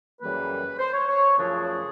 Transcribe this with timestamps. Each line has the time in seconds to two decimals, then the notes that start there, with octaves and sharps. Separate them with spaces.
0.21 F#2 C#3 E3 G3 A#3 B4
0.79 C5
0.93 C#5
1.07 C#5
1.37 F#2 C#3 F3 A3 D4 G#4